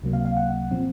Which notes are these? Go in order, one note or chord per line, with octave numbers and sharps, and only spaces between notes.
C#2 C3 F#3 A#3
F5
F5
F#5
A#2 F3 C4